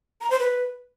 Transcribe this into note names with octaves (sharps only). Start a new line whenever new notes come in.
A#5
C5
B4